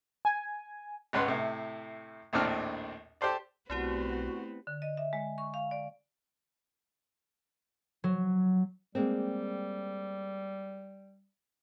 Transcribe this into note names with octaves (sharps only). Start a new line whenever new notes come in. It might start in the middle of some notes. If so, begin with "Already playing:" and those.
G#5
G#1 C#2 B4 F#5 C6
A2 C3 E4
A#1 D#2 A2 C4 D4 F6
G4 A4 C5 D5
B1 A3 B3 C4 E4 F#4 G4
D3
D#5
E5
G#3
C#6
F5
D5
F#3
G3 G#3 A#3 C4